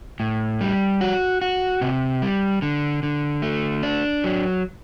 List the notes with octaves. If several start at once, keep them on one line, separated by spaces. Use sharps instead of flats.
A2
G3
F#4
F#4
C3
G3
D3
D3
A3
D4
F#3